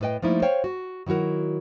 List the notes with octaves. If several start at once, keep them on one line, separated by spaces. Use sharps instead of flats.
A2 A3 B4 D#5 G5
F3 G3 A3 A#3 D#4 E4
C5 C#5 F5 G5
F#4
D#3 F#3 E4 F#4 A#4